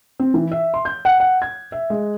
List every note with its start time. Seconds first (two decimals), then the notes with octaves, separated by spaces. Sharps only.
0.19 C4
0.34 E3
0.52 E5
0.74 C6
0.85 G6
1.05 F#5
1.20 F#5
1.42 G#6
1.72 E5
1.90 G#3